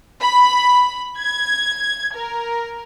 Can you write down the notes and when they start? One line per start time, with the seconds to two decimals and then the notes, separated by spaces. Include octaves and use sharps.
0.22 B5
1.18 G#6
2.16 A#4